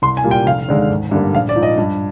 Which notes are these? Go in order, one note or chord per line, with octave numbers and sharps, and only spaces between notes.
C2 C6
G#5
A#2 G3 A#3
G5
F1 F5
D#2 D3 G#3
G#1
G2 D3 G3 A#3
A#1 F5
D5
G#2 F3
D#5
G2